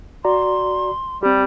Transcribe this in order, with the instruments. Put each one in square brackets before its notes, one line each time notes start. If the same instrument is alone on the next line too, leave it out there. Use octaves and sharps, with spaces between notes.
[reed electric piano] F#4 D5 A#5 [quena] C6
[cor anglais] G3 [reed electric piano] C4 G4